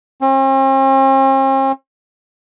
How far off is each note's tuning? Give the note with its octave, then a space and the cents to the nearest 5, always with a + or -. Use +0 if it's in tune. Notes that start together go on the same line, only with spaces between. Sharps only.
C4 +45